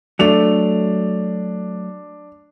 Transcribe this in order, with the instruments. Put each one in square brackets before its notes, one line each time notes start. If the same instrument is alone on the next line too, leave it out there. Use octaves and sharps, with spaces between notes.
[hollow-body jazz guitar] F#3 A3 [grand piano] D4 F7